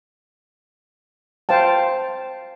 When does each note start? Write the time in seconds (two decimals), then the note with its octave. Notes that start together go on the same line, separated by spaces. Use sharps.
1.49 C5 F5 G5 A5